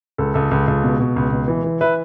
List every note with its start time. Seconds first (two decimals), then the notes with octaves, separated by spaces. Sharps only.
0.18 C#2 A4
0.34 C#2 A4
0.51 C#2
0.68 C#2
0.83 B2
1.00 B2
1.16 C#2
1.32 B2
1.48 E3
1.64 E3
1.81 E3 B4 E5